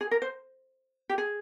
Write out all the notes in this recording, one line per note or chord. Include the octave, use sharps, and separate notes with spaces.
G#4
A#4
C5
G4
G#4